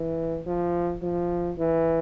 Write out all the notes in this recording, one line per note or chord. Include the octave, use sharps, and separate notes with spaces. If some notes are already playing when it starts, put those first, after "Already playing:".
Already playing: E3
F3
F3
E3